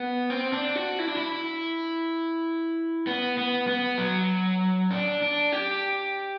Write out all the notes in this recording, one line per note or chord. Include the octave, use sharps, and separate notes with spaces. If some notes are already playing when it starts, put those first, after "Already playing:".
Already playing: B3
C4
D4
F#4
E4
D4
E4
B3
B3
B3
F#3
D4
D4
G4